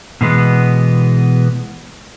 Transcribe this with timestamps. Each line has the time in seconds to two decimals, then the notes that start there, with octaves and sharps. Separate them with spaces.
0.21 B2 E3 G#3 B3